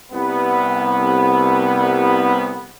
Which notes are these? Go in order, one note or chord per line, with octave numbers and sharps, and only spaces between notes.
C2 B3